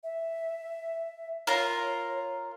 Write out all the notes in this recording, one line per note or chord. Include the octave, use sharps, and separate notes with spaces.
E5
F4 A#4 C#5